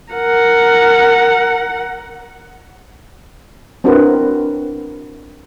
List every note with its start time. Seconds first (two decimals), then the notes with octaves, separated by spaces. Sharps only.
0.12 A#4 F#5
3.84 C4 D4 E4 F#4 A#4 B4